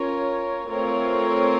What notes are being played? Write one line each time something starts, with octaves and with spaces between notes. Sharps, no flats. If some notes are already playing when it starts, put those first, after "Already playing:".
Already playing: C#4 F4 A#4 C#5
A3 C4 F4 A#4 C#5